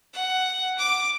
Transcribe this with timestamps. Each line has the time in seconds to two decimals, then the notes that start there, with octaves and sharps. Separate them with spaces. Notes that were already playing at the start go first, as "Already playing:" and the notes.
0.13 F#5
0.78 D6